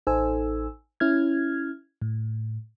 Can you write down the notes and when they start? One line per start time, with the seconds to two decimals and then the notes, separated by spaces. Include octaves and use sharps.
0.07 A1 D#4 A4 C5 G#5 E6
1.00 C#4 E4 F6 G#6
2.02 A2